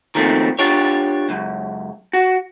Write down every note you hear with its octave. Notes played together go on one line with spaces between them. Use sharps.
D#3 F3 A3 A#3 C4
D4 F4 G4 C#5
C#2 F#2
F#4